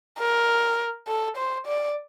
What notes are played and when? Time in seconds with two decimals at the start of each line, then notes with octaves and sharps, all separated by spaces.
0.19 A#4
1.08 A4
1.37 C5
1.67 D5